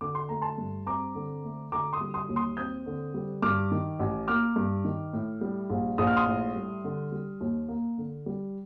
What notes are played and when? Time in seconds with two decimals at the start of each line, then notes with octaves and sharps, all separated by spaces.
0.01 D3 D6
0.15 C6
0.29 A3 A#5
0.42 A5 C6
0.58 G2
0.86 C4 A#5 D6
1.15 D3
1.44 A3
1.72 D3 A#5 D6
1.93 C6 D#6
2.01 G3
2.14 C6 D#6
2.29 D#2
2.36 C6 D#6
2.57 C4 D#6 G6
2.86 D3
3.14 G3
3.42 G2 D6 F6
3.71 D#3
3.99 A1
4.28 A#3 D6 F6
4.56 G2
4.84 D#3
5.13 A2
5.41 G3
5.70 A#1
5.98 A#1 D#6
6.07 F6
6.17 C6 D#6
6.26 A2
6.56 G3
6.84 D3
7.12 G3
7.41 D#2
7.68 A#3
7.98 D3
8.26 G3